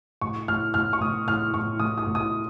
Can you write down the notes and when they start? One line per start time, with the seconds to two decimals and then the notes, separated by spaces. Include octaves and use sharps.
0.21 A2 C#6
0.48 A2 F6
0.74 A2 F6
0.93 C#6
1.01 A2 D#6
1.27 A2 F6
1.53 A2 C#6
1.80 A2 D#6
1.97 D#6
2.07 A2
2.15 D#6